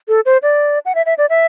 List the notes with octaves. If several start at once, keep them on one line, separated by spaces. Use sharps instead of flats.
A4
C5
D5
F#5
E5
E5
D5
E5